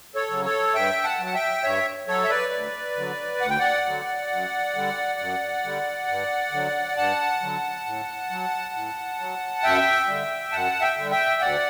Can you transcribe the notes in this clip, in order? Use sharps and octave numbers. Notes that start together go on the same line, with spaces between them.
A4 C#5
C#3 F#3
A4 C#5
G2 E5 G5
F#5 A5
F#3
F#5
E5 G5
G2 C#5 E5
F#3 A4 C#5
E5
B4 D5
D2
D3 F#3
D2 F#5
G5
D5 F#5
D3 F#3
F#2
D3 G3
F#2
D3 G3
G2
D3 F#3
G2 F#5 A5
D3 F#3
A2
F#3
A2
F#3
F#2 E5 G5
D3 G3
F#2 F#5 A5
E5 G5
D3 G3
E5 G5
D2 D5 F#5